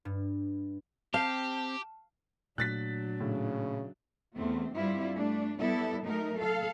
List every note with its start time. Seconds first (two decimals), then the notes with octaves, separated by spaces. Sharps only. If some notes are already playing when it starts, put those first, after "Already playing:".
0.05 G2
1.14 C4 G4 F5 A5
2.58 A#2 F#3 A3 D4 F#6 A6 B6
3.20 A2 C#3
4.34 E2 A3 C4
4.74 G2 G3 C4 E4 F4
5.15 A3 D4
5.59 G3 B3 E4 A4
6.04 F#3 A3 D#4 A#4
6.37 A4 F5